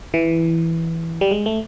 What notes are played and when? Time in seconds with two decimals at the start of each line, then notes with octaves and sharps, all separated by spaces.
0.14 E3
1.21 G3
1.31 G#3
1.46 A3